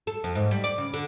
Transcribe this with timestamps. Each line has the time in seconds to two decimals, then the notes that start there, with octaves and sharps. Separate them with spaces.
0.07 A4
0.24 F2
0.35 G#2
0.51 G3
0.64 D5
0.78 C#3
0.94 D3